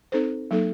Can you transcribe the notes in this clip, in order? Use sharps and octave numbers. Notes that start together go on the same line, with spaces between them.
C4 D#4 A4 C5
F#3 A#3 D#4 A4